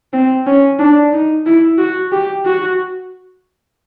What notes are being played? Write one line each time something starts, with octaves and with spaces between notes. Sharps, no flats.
C4
C#4
D4
D#4
E4
F#4
G4
F#4